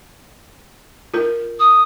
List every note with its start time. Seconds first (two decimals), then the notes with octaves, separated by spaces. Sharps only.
1.14 F4 A#4
1.60 D#6